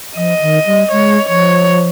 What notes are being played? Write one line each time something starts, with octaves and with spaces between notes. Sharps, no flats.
F3 D#5
D#3
G3
G#3 C#5
F3 C#5